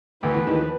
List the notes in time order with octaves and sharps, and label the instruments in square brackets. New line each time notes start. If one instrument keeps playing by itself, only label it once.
[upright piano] D2 D3 [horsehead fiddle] B4
[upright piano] E2 E3
D#2 D#3
F3